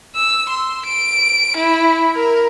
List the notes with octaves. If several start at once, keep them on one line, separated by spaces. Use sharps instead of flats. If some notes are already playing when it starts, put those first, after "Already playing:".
E6
C6
D7
E4
A#4